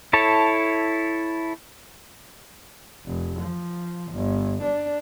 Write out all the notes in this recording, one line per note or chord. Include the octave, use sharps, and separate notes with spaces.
E4 A4 C#5 A5
F1
F3
G1
D4